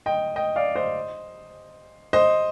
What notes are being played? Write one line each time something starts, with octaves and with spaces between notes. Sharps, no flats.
D#5 G5
D#5 G5
D5 F5
C5 D#5
C5 D#5